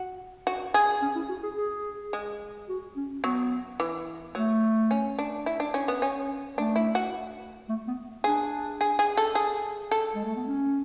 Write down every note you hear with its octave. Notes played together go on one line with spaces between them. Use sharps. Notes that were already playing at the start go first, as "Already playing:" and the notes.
Already playing: F#4
F#4
G#4
C#4
E4
F#4
G#4
G#4
G#3
F#4
C#4
F#3 B3
E3
F#3 A3
C#4
D4
E4
D4
C#4
B3
C#4
A3 D4
E4
F#4
A3
B3
D4 G#4
G#4
G#4
A4
G#4
A4
G#3
A3
B3
C#4